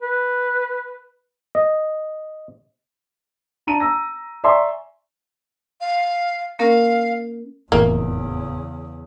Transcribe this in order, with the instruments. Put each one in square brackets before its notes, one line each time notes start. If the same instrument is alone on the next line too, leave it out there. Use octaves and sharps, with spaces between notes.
[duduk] B4
[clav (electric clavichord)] D#5
[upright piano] D4 A5 A#5 D#7
A#5 E6 A#6
D5 E5 G#5 A#5 C6 C#6
[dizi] F5
[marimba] A#3 C#4 A#4 [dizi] F5
[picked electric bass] F1 A2 E3 [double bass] E2 C#3 [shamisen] A#3